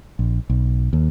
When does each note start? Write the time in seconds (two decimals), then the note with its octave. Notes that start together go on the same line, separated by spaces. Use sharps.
0.19 A#1
0.49 B1
0.93 D#2